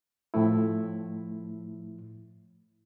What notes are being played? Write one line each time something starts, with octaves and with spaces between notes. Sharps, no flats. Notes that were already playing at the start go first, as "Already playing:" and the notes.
A2 F3 A3 E4